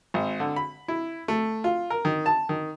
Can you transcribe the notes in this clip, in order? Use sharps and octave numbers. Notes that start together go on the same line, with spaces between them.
G#1
D3
B5
E4
A3
F4
A#4
D#3
A5
D#3